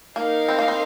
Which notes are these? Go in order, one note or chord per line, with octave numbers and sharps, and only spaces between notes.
A#3 D#4 A#4 F5
C4
A#3
C4